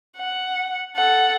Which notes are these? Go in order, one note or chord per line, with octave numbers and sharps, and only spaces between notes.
F#5
A4 F#5